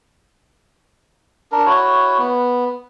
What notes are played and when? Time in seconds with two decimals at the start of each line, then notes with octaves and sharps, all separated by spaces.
1.52 D4 A#4
1.66 E4 F#4 C#5
2.18 B3